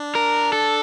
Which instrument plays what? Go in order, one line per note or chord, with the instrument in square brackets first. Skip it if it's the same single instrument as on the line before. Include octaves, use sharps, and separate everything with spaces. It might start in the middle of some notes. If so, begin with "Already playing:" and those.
Already playing: [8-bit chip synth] D4
[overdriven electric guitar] A#4
A4